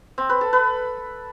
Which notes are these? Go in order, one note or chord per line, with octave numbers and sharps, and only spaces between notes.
C4
B4
A4
B4